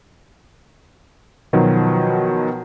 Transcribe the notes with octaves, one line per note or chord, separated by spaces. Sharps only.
B2 D#3 F3 F#3